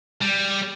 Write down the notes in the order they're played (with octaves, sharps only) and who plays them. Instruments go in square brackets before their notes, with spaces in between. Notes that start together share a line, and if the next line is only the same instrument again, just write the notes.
[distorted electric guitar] G3